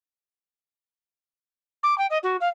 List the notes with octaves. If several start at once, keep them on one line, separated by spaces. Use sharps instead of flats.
D6
G5
D#5
F#4
F5